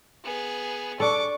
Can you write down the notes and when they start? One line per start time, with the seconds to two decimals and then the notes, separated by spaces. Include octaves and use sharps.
0.24 B3 G#4
1.00 D4 A4 C#6 D6